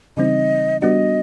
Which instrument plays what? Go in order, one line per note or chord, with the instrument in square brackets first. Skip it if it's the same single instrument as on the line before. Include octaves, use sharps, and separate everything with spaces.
[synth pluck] C#3 E3 G3 C4 D#4 [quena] D#5
[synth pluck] G3 B3 D4 F#4 [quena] D#5